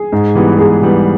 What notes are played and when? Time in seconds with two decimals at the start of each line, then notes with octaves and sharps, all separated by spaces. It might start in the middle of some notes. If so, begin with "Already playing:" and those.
Already playing: G#4
0.13 G#2
0.35 E3 G3 B3
0.58 G#2 G#4
0.81 E3 G3 B3